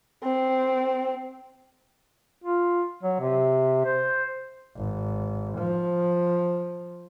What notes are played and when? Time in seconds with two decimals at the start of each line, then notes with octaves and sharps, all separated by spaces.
0.23 C4
2.44 F4
3.03 F#3
3.20 C3
3.85 C5
4.76 G#1
5.58 F3